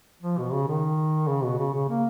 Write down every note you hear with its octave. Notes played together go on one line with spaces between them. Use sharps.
F3
B2
C#3
D#3
C#3
B2
C#3
C#3
A#3